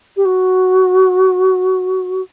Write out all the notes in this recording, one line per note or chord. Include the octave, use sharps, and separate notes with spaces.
G4
F#4